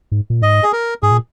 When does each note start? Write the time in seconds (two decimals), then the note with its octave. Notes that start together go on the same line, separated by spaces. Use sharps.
0.12 G#2
0.30 A#2
0.42 G#2 D#5
0.63 G#4
0.73 A#4
1.03 G#2 G#4
1.11 A#2